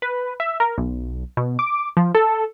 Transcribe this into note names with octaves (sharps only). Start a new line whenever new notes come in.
B4
E5
A#4
B1
B2
D6
F3
A4